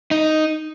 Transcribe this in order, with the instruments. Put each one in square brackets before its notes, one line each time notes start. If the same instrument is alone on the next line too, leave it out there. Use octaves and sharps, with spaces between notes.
[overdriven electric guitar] D#4